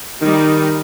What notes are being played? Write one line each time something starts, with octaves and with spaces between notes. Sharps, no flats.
D#3 G3 D#4